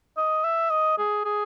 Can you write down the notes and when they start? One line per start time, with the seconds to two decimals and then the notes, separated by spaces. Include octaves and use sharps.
0.17 D#5
0.44 E5
0.70 D#5
0.98 G#4
1.25 G#4